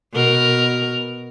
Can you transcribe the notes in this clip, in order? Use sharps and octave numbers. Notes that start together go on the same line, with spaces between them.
B2 A#4